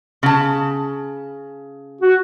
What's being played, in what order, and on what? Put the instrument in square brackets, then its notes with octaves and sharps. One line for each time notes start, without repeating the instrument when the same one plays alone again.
[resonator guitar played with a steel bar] C#3 A5
[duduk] F#4